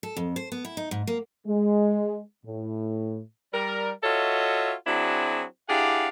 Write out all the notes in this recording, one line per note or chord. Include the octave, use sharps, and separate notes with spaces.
A4
F2
C5
B3
E4
D#4
G#2
A#3
G#3
A2
G3 A#4
F4 F#4 A4 C#5 D#5 E5
F#3 C4 D4 E4 F#4 G#4
D4 E4 G4 G#4 F5 F#5